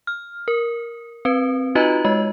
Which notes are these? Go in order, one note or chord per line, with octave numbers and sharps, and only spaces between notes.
F6
A#4
C4 B4
D#4 F4 F#4 B4 D#5 A#5
G#3 D#5